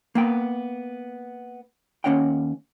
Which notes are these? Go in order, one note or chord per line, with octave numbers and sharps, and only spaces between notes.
A#3 B3 G5
D#2 F3 C#4 C#5 F#5 G5